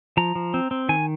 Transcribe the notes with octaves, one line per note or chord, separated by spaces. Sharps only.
F3 A#5
F3
C4
C4
D#3 G#5